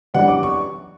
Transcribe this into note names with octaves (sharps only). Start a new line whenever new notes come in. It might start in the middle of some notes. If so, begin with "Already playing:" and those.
F#2 E3 G3 D4 F#5
D6
C#6